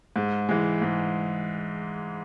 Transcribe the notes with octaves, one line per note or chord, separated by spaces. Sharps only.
G#2
E3 G#3
G#2